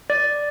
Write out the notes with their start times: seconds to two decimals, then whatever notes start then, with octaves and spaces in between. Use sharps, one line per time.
0.10 D5